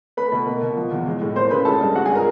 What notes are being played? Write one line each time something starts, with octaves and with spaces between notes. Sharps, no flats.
A3 B4 B5
B2
A#3
B2
F3
E2
G#3
A2
A#3 C5 C6
C#3 B4 B5
G#3 A4 A5
G2
G#3 F#4 F#5
G#4 G#5
A#4 A#5